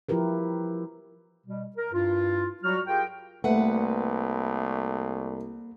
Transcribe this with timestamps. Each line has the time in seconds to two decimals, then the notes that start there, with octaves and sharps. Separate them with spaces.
0.09 F3 E4 F4 G4 A#4 B4
1.46 B2 G3
1.76 A#4
1.93 G2 E4 F4
2.63 F#3 G3 F#4 F6
2.87 F4 G4 G#4 A#4 G5
3.44 C2 A3 A#3 B4 F#5